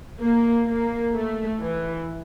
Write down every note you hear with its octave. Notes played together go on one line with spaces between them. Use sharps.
A#3
A#3
A3
E3